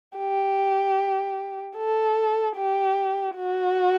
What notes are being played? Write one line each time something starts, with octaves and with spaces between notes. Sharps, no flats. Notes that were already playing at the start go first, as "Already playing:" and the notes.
G4
A4
G4
F#4